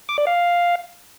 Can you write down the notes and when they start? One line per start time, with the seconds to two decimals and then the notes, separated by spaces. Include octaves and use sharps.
0.09 D6
0.18 D5
0.27 F5